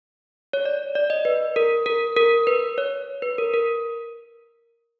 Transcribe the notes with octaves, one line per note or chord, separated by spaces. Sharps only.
C#5
D5
D5
D#5
B4
A#4
A#4
A#4
B4
C#5
B4
A#4
A#4